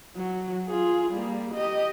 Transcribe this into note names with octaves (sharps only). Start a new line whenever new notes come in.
F#3
F4 G#4
G3 A#3
G4 D#5